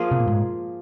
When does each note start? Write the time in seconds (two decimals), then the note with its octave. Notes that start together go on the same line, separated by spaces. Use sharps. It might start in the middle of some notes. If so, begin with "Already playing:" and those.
Already playing: F3 A#3 F4 G#4
0.11 C3
0.20 A#2
0.27 G#2